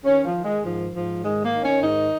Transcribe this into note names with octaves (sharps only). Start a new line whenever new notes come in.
D#3 C#4
F3
D#3
G#3
G#2 F3
G#2 F3
D#3 G#3
A#3
D#3
C#4
G#2 D#4